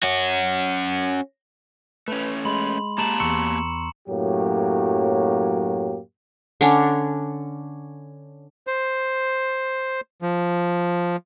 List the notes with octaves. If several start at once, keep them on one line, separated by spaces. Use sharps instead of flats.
C#4 F#4
A3 C#4 B4
G#3 B5 C6 F#7
A#3 G4 A5 A#5 E7 F#7
E2 C6 C#6 E6 C#7
F#2 A2 F#3 A#3 G4
D3 C#4 D4
C5
F3